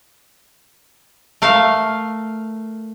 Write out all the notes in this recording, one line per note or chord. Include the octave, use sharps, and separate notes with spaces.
A3 A#4 F5